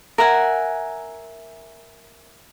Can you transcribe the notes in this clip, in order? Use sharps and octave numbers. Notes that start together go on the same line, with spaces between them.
A#4 E5 F#5 G#5